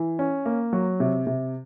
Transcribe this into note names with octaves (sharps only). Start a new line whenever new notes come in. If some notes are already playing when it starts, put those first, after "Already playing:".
Already playing: E3
C#4
A#3
F#3
C3
C3